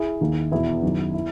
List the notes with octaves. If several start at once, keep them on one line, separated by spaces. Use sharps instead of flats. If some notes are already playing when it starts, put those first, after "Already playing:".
Already playing: E4 G#4
D#2 D#3
E2 B2 E4
F#2 D#3
E4